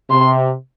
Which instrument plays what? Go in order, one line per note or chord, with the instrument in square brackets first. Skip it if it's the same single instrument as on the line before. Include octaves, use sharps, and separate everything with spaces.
[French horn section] C3 [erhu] C6